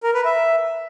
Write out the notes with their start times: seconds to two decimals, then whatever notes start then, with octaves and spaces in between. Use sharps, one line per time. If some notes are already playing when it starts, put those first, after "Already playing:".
0.03 A#4
0.14 B4
0.25 E5